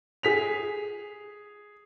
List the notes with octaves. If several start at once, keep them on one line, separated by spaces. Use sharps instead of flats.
G#4 B6 F7